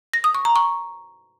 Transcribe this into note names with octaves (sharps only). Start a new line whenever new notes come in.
A#6
D#6
C#6
A#5
C#6